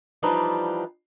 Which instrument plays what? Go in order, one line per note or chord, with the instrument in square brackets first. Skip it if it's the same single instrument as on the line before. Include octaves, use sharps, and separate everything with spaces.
[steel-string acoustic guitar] E3 F3 G3 D4 D#4 B4